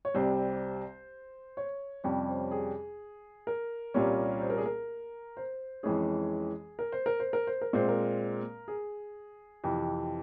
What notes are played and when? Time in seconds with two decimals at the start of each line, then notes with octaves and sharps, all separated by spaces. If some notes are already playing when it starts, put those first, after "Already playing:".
0.05 C#5
0.14 C2 C3 G3 C4 C5
1.57 C#5
2.04 F2 C3 G3 C#4 C#5
2.29 C5
2.51 G#4
3.47 A#4
3.94 C2 A#2 G3 C#4
4.41 C5
4.50 A#4
4.58 G#4
4.66 A#4
5.37 C5
5.83 F2 E3 G#3 C#4 G#4
6.79 A#4
6.92 C5
7.06 A#4
7.20 C5
7.33 A#4
7.47 C5
7.61 A#4
7.73 A#2 G#3 C4 C5
7.88 A#4
8.68 G#4
9.64 F2 C3 E3